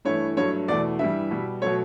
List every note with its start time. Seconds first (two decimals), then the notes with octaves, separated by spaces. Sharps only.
0.05 G2 E3 A3 C#5
0.37 G2 F#3 A3 C#5
0.68 E2 B2 A3 D5
0.99 G2 E3 G3 E5
1.30 B2 G3
1.61 B2 F#3 A3 C#5